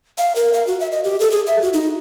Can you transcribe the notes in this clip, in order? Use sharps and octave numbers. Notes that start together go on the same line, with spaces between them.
F5
A#4
F5
F#4
E5
D#5
G4
A4
G#4
E5
F#4
D#4